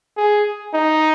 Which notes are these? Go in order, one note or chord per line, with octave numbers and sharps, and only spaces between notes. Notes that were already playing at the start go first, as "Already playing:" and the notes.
G#4
D#4